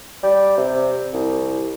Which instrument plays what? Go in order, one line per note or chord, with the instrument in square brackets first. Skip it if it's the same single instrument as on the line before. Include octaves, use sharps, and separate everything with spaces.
[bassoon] G3
C3
C2